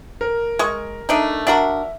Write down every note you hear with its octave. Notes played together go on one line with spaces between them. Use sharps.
A#4
G#3 C#6
A3 D4 D#4
D4 F#4 A#4 E5